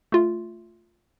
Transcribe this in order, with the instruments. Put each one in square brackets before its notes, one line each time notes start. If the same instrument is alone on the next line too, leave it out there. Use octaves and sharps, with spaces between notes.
[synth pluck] A3 F4